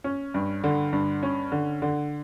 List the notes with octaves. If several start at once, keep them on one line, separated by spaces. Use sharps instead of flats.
C#4
G2
D3
G2
C#4
D3
D3